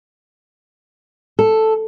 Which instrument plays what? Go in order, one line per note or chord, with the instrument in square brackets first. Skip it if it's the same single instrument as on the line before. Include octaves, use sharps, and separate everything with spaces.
[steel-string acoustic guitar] A4